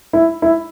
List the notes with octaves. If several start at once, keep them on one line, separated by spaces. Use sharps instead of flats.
E4
E4